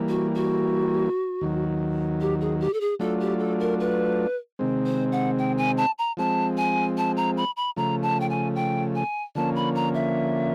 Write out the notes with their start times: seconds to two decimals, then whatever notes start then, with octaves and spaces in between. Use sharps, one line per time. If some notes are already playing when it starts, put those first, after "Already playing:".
Already playing: E3 G3 A#3
0.09 F#4
0.35 F#4
1.41 D#2 D#3 F#3
2.21 G4
2.41 G#4
2.60 G4
2.73 A4
2.81 G#4
2.99 F#3 A3 D4 F4 A4
3.20 G4
3.39 A4
3.60 A#4
3.80 B4
4.59 C3 D#3 G#3 C4
4.86 C5
5.12 F#5
5.38 G5
5.58 G#5
5.77 A5
5.98 A#5
6.17 F3 G#3 C4 A5
6.57 G#5
6.98 A5
7.17 A#5
7.37 B5
7.57 B5
7.76 C#3 F3 A3 A#5
8.03 A5
8.20 G5
8.30 G#5
8.55 G5
8.95 G#5
9.35 D3 F3 A#3 C#4 A5
9.56 B5
9.75 A#5
9.95 E5